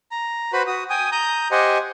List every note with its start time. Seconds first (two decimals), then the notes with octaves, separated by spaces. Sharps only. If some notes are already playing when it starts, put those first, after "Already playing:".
0.11 A#5
0.53 F#4 B4 C5 B5
0.67 F#4 D#6
0.90 G5 G#5 D#6
1.12 A#5 D#6 G6
1.51 G4 C5 D#5 F#5 G#5